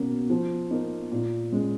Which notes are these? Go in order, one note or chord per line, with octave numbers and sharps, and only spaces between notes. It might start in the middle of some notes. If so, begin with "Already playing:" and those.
Already playing: B2 A#3 C#4
F3
A#3 D#4
A#2
G#3 C#4